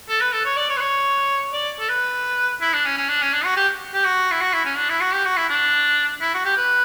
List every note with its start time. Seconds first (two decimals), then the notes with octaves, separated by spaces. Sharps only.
0.09 A4
0.21 B4
0.33 A4
0.45 C#5
0.57 D5
0.70 C#5
0.77 B4
0.80 C#5
1.53 D5
1.79 A4
1.89 B4
2.61 E4
2.73 D4
2.85 C#4
2.97 C#4
3.09 D4
3.22 C#4
3.33 D4
3.45 F#4
3.57 G4
3.94 G4
4.05 F#4
4.31 E4
4.41 F#4
4.53 E4
4.65 C#4
4.77 D4
4.89 E4
5.01 F#4
5.14 G4
5.25 F#4
5.37 E4
5.49 D4
6.21 E4
6.34 F#4
6.45 G4
6.57 B4